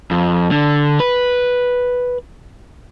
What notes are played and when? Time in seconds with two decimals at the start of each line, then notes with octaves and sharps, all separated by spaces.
0.11 F2
0.51 D3
1.00 B4